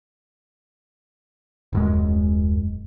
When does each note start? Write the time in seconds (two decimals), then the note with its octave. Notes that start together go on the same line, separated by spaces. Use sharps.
1.73 D#1 F#2 G#3